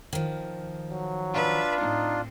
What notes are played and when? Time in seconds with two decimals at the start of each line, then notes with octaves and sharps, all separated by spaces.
0.13 D#3 F3
0.90 F#3
1.34 D4 F4 B4 E5
1.80 A2 C4 D#4